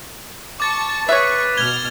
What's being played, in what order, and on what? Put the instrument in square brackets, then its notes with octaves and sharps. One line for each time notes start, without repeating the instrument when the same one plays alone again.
[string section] A5 C#6 [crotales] D6 A6
[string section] G#4 C#6 [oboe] B4 [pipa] C#5 E5
[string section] B2 F6 [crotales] G#6 G7